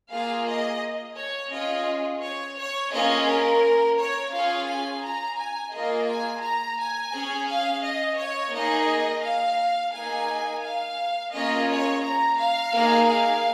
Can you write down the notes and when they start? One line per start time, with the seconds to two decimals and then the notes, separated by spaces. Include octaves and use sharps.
0.11 A#3 F4 G#4 F5
0.46 D#5
1.17 C#5
1.52 C#4 F4 G#4 D#5
2.22 C#5
2.58 C#5
2.92 A#3 C#4 F4 G#4 D#5
3.27 A#4
3.98 C#5
4.32 C#4 F4 G#4 F5
4.67 G#5
5.02 A#5
5.38 G#5
5.72 A#3 F4 G#4 D#5
6.07 G#5
6.42 A#5
6.78 G#5
7.13 C#4 G#4
7.47 F5
7.82 D#5
8.17 C#5
8.53 A#3 D#4 G#4 D#5
9.23 F5
9.93 A#3 D#4 G#4 G#5
10.63 F5
11.34 A#3 C#4 F4 G#4 D#5
11.69 C#5
12.03 A#5
12.39 F5
12.74 A#3 D#4 G#4
13.09 F5